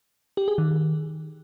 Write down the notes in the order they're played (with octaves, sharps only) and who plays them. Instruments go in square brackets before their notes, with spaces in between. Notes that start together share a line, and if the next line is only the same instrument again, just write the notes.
[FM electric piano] G4
G#4
D#3